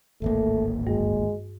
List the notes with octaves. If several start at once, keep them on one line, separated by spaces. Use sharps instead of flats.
D1 G#1 A3 A#3
G2 G#3